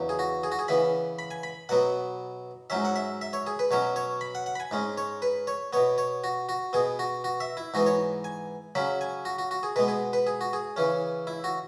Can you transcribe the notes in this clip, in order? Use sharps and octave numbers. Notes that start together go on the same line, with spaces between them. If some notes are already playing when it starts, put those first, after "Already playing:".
Already playing: E2 C#3 F#3
G#4
F#4
G#4
F#4
G#4
C#3 E3 B3 B5
B5
G#5
B5
B2 F#3 B3 F#5
G#2 F#3 C#4 E5
F#5
E5
E5
C#5
G#4
B4
B2 F#3 C#4 C#5
C#5
B5
F#5
F#5
B5
G#5
G#2 G#3 C#4
C#5
B4
C#5
B2 B3 C#5
C#5
F#4
F#4
B2 B3 G#4
F#4
F#4
E5
E4
G#2 E3 B3 F#4
C#5
G#5
C#3 F#3 C#4 B5
G#5
F#4
F#4
F#4
G#4
B2 G#3 B3 B4
G#4
B4
G#4
F#4
G#4
C#3 E3 C#4
E4
F#4